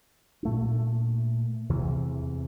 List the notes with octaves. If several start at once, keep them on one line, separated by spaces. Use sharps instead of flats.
A#2 A3 D4
E2 C3 E3